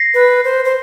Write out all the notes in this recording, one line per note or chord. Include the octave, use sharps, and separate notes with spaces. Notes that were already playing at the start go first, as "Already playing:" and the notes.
Already playing: A#6 C7
B4
C5
C5